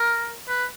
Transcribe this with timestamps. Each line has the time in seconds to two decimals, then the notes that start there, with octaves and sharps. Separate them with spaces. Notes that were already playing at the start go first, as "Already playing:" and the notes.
Already playing: A#4
0.49 B4